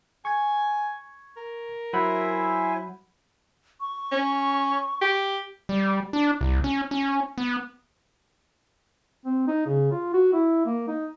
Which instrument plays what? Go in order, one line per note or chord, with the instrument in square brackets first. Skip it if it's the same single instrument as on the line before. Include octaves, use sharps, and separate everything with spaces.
[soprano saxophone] G#5 [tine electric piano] C#6 G#6
[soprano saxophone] A#4
[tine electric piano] F#3 F#5 B5 [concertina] E4 [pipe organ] C5 E5 G#5
[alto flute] C#6
[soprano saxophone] C#4
G4
[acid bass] G3
D4
C2
C#4
C#4
B3
[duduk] C4
D#4
C#3
F4
F#4
E4
A#3
D#4